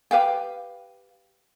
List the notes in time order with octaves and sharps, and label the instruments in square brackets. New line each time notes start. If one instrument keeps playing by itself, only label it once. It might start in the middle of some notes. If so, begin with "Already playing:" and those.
[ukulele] G4 B4 F5 G5